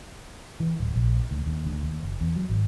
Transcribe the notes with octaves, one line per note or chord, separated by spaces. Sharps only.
E3
D1
A#1
D2
D#2
D2
D#2
F#1
E2
F#3
G#1